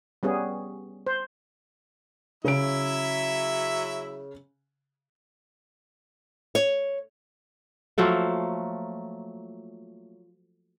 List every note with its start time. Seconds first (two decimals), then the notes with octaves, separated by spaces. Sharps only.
0.23 G3 B3 C#4 G#4
1.07 C5
2.45 C#3 F#3 E4 E5 D7
6.55 C#5
7.98 F3 F#3 A3 A#3